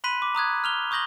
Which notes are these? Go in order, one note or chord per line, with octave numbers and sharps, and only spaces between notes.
B5 C6 F#6 B6 D#7 F#7
D6
A#5 D#6 F#6 G#6
F6 F7 G7
C#6 D#6 G6 A#6 F#7 G7